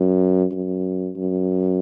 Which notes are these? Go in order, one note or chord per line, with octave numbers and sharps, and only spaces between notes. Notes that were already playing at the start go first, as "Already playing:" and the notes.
Already playing: F#2
F#2
F#2